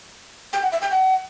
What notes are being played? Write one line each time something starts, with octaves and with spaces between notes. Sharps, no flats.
G5
F#5
E5
G5
F#5